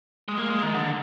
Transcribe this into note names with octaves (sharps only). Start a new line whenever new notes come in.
G#3
A#3
G#3
D#3
D3